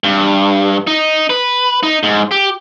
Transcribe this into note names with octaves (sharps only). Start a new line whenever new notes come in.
G2
D#4
B4
D#4
G#2
G4